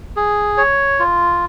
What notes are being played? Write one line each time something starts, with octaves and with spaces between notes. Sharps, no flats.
G#4
C#5
F4